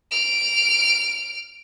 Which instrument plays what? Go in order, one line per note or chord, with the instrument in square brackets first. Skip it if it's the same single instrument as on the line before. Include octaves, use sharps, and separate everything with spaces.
[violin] F6 D7